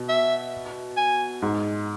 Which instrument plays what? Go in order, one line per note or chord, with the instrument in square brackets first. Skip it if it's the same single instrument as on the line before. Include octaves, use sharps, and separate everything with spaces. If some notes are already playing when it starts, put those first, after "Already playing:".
Already playing: [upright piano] B2
[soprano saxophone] E5
G#5
[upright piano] G#2